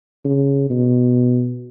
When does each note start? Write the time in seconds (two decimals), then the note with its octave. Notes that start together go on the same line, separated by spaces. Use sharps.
0.24 C#3
0.70 B2